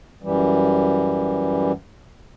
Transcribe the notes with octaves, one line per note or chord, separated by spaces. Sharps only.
F#2 E3 G3